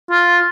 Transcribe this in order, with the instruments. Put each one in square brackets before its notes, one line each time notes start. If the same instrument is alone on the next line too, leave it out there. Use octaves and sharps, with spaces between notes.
[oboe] F4